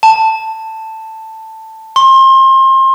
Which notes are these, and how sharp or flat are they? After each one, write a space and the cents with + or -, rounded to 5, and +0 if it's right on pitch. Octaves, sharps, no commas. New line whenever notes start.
A5 +10
C6 +30